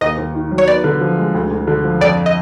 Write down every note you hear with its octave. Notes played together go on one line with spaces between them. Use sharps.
D#2 D#5
D#2
D#3
F#3
C#5
B3 D5
D3
F3
G#3
D2
D2
D3
F3
F2 D5
D#5